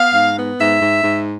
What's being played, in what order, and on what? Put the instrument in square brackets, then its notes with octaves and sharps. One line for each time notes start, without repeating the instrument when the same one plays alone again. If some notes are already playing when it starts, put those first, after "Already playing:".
Already playing: [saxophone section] B3 F5
G#2
B3
G#2 E5
G#2
G#2